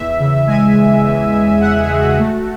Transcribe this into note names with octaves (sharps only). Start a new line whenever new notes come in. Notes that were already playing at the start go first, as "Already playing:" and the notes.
Already playing: E2 E5
C#3
G#3 G#5
E2
E2
C#3
C#3 F#5
G#4
G#3
F#4
A3